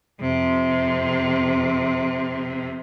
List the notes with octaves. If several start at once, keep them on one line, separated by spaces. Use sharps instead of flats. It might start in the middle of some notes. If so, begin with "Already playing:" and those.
F2 C3